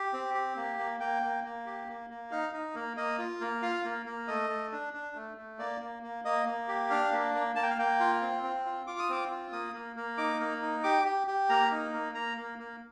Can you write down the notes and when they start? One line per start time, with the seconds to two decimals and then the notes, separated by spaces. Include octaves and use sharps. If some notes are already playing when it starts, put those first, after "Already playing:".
Already playing: G4
0.13 C4
0.34 G4
0.57 A#3
0.78 A#3
1.00 A#3 G5
1.22 A#3
1.44 A#3
1.66 G4
1.88 A#3
2.10 A#3
2.31 D#4 F5
2.53 D#4
2.75 A#3
2.97 A#3 D#5
3.18 F4
3.41 A#3
3.62 F4 F5
3.84 A#3
4.06 A#3
4.28 A3 D#5
4.50 A3
4.72 D4
4.93 D4
5.15 A3
5.37 A3
5.59 A#3 D5
5.80 A#3
6.03 A#3
6.25 A#3 D#5
6.46 A#3
6.68 G4
6.90 D4 F5
7.12 A#3
7.34 A#3
7.56 A#3 A5
7.63 G5
7.70 F5
7.78 A#3 G5
8.00 F4
8.22 C4
8.43 C4
8.65 F4
8.87 F4 D6
8.99 D#6
9.09 C4 D6
9.31 F4
9.52 A#3 D#6
9.74 A#3
9.96 A#3
10.18 D#4 D6
10.40 A#3
10.62 D#4
10.84 G4 D6
11.05 G4
11.27 G4
11.49 A#3 A#5
11.71 D#4
11.93 A#3
12.14 A#3 A#5
12.37 A#3
12.58 A#3